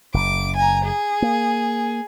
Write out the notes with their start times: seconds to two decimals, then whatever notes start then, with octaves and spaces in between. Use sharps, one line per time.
0.14 F#1 D6
0.55 G#5 A#5
0.84 G#4
1.22 A#3